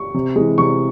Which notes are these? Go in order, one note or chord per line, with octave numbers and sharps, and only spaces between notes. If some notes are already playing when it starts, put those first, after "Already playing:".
Already playing: C#6
C3
E3 G#3
C3 C#6